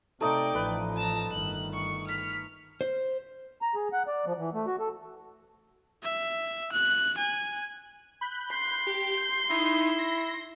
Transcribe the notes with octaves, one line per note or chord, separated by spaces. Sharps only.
C3 A3 D#4 D5 D#5 G5
A1 F3 B4
A5 A#5
G1 D#3 F#6
C#6
F6 B6
C5
A#5
G#4
F#5
D5
F3
E3
A3
F#4
A4
E5
F#6
G#5
B5 F#6 G6
C6
G4
G6
D#4 E4
A#6